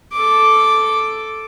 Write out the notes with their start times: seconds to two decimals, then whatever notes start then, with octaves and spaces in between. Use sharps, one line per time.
0.13 A4 D6